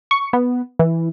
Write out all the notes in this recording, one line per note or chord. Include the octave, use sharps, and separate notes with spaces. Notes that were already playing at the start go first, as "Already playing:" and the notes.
C#6
B3
E3